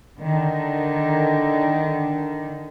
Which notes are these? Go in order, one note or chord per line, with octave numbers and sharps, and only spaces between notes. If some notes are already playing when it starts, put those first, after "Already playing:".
D3 D#3